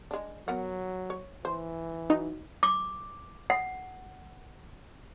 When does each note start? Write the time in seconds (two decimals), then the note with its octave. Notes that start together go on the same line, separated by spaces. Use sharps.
0.11 G#3 D4
0.48 F#3 B3 A#4 F#5
1.10 C#5
1.45 E3 C5
2.10 F#3 D#4
2.63 D6
3.50 F#5